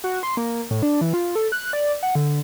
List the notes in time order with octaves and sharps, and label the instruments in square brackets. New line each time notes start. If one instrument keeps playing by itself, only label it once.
[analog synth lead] F#4
C6
A#3
A2
D4
E3
F4
A4
F#6
D5
F#5
D3